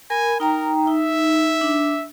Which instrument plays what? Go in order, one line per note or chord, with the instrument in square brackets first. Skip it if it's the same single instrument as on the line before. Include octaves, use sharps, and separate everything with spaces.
[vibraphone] A#4 B5 [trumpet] G#5
[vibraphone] D#4 G5 A#5 [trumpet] A#4
[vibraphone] D#4 [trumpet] E5
[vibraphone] D4